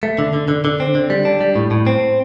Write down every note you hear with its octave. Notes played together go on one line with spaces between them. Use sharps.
A3
D3
D3
D3
D3
C4
D3
G3
D4
G3
A2
A2
C4